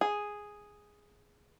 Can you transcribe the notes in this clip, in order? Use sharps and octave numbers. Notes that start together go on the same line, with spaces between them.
G#4